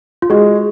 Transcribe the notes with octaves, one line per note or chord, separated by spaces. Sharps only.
F4
G#3 F#4